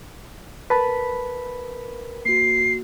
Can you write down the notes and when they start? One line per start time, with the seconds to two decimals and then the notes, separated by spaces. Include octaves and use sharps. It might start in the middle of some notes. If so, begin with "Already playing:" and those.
0.70 A#4 B4 A5 B5 B6
2.25 A#3 F#4 C7